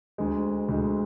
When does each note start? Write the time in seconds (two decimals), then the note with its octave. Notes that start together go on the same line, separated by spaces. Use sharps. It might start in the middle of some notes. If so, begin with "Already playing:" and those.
0.18 D2 D3 G#3
0.69 D2 D3 G#3